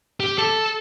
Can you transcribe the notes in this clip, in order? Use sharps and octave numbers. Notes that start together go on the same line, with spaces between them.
G4
A4